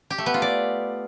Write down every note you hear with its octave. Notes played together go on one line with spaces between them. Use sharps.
G4
A3
B3
F4
D5